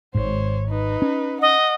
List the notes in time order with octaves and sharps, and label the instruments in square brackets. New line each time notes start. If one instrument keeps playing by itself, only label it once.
[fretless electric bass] G#1 G#2 [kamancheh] C5 C#5
[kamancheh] D#4 B4
[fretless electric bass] C#4
[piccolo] D#5 [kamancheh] F#5